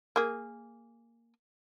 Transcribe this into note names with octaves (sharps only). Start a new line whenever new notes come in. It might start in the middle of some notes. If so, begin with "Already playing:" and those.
A#3 G#4